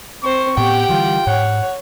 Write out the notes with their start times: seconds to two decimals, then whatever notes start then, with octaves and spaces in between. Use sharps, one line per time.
0.23 C4 C5 C#6
0.57 A2 B3 G4 F#5 G5
0.89 D3 E3 G3 F4
1.27 G#2 C#5 F#5